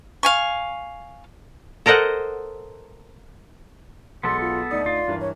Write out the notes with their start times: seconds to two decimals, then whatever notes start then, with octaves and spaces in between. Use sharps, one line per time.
0.23 F5 G#5 C#6
1.86 A4 A#4 C5 D#5 F#5
4.23 B1 G#3 B3 A4 C6
4.41 F4
4.71 D2 D#4 D5 D#6
4.86 F4
5.08 G2 E3 A#4
5.21 C#5